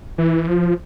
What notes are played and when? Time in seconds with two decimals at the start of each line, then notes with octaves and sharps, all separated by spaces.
0.18 E3
0.47 F3